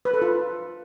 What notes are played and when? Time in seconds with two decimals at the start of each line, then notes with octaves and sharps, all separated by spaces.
0.05 B4
0.13 A4
0.22 F4